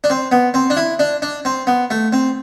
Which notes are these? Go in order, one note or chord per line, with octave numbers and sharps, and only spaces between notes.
D4
C4
B3
C4
D4
E4
D4
D4
C4
B3
A3
C4